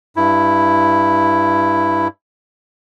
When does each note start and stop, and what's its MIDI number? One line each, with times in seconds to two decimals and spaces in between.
0.16 2.08 43
0.16 2.08 64